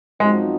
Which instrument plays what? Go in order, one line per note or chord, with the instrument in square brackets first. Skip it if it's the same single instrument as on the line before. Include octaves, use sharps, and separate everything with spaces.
[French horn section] F#2 F3 C4 D#4 F#4 [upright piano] G#3